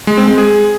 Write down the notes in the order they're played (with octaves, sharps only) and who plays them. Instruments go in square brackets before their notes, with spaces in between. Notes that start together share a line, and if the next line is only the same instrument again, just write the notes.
[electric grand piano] G#3
C4
G#3
G#4